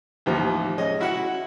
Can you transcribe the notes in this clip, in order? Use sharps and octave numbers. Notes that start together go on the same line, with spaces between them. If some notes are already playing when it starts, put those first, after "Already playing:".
A1 D#2 F3
G#3 C#4 D#5
E4 F#4 E5 F#5